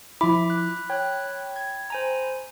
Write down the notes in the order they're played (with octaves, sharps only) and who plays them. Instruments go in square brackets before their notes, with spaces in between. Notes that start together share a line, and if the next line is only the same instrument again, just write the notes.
[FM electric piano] F3 E4 [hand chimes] B5 [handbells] D6
[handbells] F#6
[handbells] C#5 F#6 [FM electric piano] G5
[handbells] G#6
C5 G#5 A#5